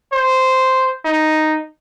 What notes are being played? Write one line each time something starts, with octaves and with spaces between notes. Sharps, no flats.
C5
D#4